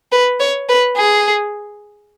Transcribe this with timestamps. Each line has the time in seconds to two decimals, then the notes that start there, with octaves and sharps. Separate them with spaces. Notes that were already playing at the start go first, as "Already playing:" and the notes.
0.12 B4
0.40 C#5
0.69 B4
0.97 G#4